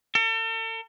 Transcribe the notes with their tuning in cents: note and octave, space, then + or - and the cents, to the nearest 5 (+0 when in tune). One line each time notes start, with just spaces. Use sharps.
A4 +40